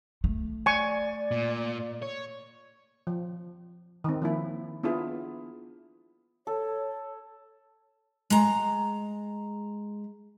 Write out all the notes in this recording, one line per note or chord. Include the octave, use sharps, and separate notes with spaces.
A3
D5 G#5 C#6
A#2
C#5
F3
D#3 C4
F3 A#3 E4
B3 D4 E4 F4 G#4
A4 C#5
G#3 A#5